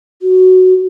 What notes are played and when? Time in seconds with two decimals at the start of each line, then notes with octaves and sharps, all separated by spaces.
0.22 F#4